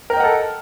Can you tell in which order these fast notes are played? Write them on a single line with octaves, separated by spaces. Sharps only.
A#4 G5 D#5 F#5 A4